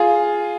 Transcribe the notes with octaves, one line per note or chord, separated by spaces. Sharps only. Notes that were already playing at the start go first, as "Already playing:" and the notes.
Already playing: F4 G#4